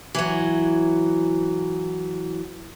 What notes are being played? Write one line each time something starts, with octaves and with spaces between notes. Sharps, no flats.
E3 F#3